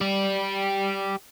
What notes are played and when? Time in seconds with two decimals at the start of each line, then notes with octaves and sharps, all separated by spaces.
0.01 G4 D5